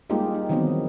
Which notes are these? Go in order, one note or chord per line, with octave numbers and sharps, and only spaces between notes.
G3 G#3 A#3 D#4 F4 G4
D#4
D#3 E3 F#3 B3 C4 D#4